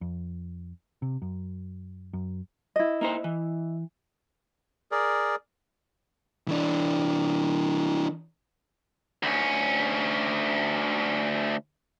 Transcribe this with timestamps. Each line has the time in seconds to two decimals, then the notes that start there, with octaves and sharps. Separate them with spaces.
0.01 F2
1.02 C3
1.22 F#2
2.13 F#2
2.76 E4 D#5
3.01 A#3 D#4 C5
3.24 E3
4.92 G#4 A#4 D5
6.48 E3 D4
9.23 D2 C#4